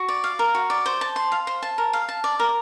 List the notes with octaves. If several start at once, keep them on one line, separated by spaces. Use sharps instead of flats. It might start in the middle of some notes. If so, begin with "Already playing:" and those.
Already playing: F#4
D5
F5
A#4
F#4
D5
C5
A5
C6
F5
C5
A5
A#4
F5
A5
D5
A#4